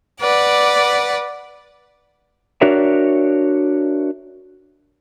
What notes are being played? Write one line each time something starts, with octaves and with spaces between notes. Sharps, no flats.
B4 D5 F#5 D6
D4 F#4 A#4 C#5 D5 E5